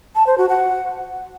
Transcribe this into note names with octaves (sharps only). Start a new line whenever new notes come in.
A5
C5
F#4
F#5